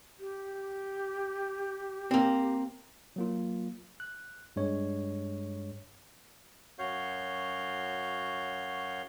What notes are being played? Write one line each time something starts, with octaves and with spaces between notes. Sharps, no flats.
G4
A#3 C4
F#3 A#3 F4
F#6
G2 G#3 C#5
F#2 F#4 C#5 F5 G6